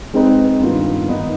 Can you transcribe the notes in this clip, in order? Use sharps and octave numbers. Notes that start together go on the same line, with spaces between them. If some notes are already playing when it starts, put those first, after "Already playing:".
G#3 C4 D#4 B4
G2 D#3 B3 F4
G#2 D#3 B3 D#4